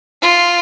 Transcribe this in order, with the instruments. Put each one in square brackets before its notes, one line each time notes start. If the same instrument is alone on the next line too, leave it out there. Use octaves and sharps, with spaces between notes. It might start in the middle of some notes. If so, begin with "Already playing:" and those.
[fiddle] F4